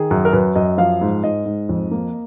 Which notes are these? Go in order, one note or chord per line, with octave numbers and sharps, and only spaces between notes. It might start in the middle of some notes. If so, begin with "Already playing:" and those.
Already playing: D#3 G#4
F#2
A#4
F#2 B4
F#2 D#5
F3 F5
G#2
G#2 D#5
G#2
F2
A#3